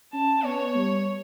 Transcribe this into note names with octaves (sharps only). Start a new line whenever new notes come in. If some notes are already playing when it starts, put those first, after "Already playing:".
C#4 A5
B3 C#5
G3